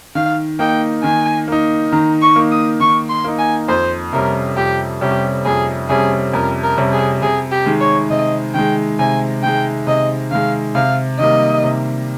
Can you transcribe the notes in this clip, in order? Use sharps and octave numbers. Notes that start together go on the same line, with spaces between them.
D#3 F5
A#3 D#4 G5
D#3 G#5
A#3 D#4
D#3 A#5
C#6
A#3 D#4
D#6
D#3 C#6
C6
A#3 D#4
G#5
F2 C5
C3 G3 C#4 A#4
F2 G4
C3 G3 C#4 G4
F2 G#4
C3 G3 C#4 G#4
F2 A#4
A#4
C3 G3 C#4
G#4
C3 G#4
G4
D#3 G#3
C#5
C3 D#5
D#3 G#3 G5
C3 G#5
D#3 G#3 G5
C3 D#5
D#3 G#3 F5
C3 F5
D#3 G3 A#3 D#5
C3